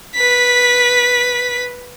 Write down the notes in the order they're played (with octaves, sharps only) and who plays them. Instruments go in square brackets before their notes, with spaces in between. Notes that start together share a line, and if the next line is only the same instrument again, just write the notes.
[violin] B4 B6